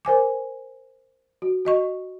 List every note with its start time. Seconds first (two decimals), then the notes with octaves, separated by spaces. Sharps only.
0.05 A#4 C5 G#5 D6
1.42 F#4
1.65 F#4 D#5 C#6